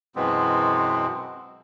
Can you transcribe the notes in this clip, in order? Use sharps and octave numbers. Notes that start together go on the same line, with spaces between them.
F#2 B2 E3 G#3 B3 C4